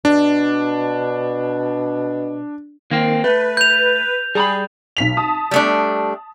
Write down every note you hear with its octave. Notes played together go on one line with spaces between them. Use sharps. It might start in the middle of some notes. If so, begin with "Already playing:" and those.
B2 D4
D#3 A#3 C4
A3 B4
G6 F7
G3 G#4 A#5 B5
B1 B6 F7
A5 D#6
G3 A3 D4